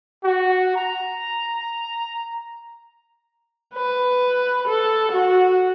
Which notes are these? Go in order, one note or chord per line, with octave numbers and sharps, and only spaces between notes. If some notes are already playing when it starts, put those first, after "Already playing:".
F#4
A#5
B4
A4
F#4